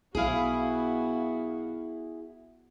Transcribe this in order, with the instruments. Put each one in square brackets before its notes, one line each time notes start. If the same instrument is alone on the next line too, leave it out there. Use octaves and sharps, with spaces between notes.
[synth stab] B1 F5 [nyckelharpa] B3 F#4 [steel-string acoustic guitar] E4 G#4